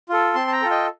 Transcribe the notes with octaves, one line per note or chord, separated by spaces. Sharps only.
F4 A4
C4 A5 C6
A5
G5 A#5
F4 A4
D#5 G5